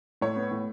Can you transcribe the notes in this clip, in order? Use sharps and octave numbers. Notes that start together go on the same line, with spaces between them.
A2 C#5
B3
A2